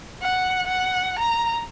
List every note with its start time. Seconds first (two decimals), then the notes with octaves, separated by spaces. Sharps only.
0.22 F#5
0.67 F#5
1.19 A#5